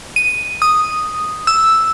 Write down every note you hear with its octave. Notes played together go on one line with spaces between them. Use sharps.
D#7
D#6
E6